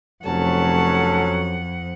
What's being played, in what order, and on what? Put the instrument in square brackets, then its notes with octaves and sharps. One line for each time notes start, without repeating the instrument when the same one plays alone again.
[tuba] F1 [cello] F2 F#5 [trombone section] F#3 C#4 A4 [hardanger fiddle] A5